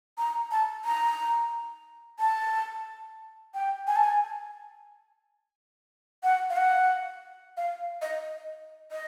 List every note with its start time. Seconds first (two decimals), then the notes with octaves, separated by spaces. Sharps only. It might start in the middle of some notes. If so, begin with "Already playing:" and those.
0.18 A#5
0.52 A5
0.85 A#5
2.20 A5
3.54 G5
3.87 G#5
3.96 A5
4.04 G#5
6.23 F#5
6.50 F5
6.57 F#5
7.57 F5
8.02 D#5
8.92 D#5